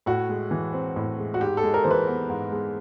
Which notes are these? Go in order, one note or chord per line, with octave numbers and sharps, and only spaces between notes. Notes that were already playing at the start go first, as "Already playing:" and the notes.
A2 F#4
G#3
E3
C4
A2
G#3
F#4
G#2 G4
A4
G#3
A#4
E3 C5
B4
B3
G#2
G#3